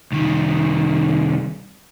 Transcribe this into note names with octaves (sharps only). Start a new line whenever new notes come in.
C2 D#3